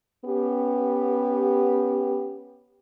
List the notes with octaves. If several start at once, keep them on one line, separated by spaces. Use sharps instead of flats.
B3 C#4 G4